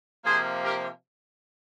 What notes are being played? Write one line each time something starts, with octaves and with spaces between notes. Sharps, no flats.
C3 F3 A#3 G#4 C5
G4 A#4